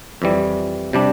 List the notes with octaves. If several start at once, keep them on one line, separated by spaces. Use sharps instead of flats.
F2 E3 G3
C3 G3 D4